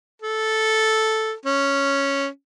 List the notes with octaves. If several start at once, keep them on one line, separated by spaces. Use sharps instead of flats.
A4
C#4